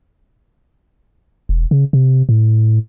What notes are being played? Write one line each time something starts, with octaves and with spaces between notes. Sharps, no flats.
E1
C#3
C3
A2